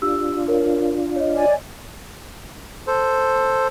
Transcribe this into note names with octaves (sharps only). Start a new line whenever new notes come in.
D4 F4 G4 E6
A#4 C#5
C#5 D#5
D5 G#5
A4 C5